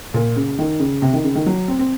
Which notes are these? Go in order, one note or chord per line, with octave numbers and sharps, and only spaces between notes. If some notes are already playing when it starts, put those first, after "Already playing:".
A#2
C#3
D#3
C#3
C3
D#3
C#3
D#3
F#3
C4
C4